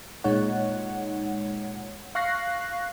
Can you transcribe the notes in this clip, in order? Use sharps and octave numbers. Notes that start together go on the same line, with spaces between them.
A#2 G#3 D#4 C#5 F#5
F5 C#6 F#6 A#6 C7